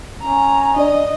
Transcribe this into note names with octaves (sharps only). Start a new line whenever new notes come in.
C#4 A#5
D4 D5 D#5